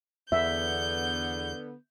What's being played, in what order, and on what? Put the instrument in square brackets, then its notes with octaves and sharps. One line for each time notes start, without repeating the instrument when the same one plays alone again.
[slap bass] E2 [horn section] D3 B3 [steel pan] E5 [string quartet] G6